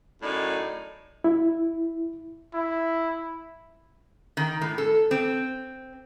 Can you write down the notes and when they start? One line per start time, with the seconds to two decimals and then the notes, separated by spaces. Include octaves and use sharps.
0.22 F#2 A2 D#4 D5
1.24 E4
2.54 E4
4.37 D#3
4.61 A2
4.78 A4
5.11 C4